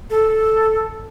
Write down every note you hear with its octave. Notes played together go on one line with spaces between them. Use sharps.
A4